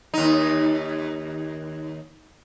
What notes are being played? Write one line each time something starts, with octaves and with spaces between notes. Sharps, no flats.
D#2 D#4